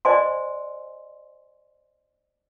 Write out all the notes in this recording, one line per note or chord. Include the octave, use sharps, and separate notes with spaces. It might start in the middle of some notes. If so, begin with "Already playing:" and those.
C5 D5 D#5 G#5 C6